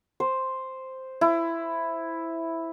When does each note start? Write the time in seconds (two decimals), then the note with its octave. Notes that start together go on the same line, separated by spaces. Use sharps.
0.20 C5
1.21 E4